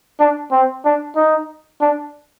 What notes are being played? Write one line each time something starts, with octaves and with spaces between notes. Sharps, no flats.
D4
C4
D4
D#4
D4